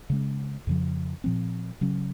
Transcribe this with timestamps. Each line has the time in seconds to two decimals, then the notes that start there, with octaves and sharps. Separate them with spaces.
0.10 C#3 G#3 C#4
0.67 F2 C#3 F3
1.24 A#2 F3 C4
1.81 C#3 F#3 C#4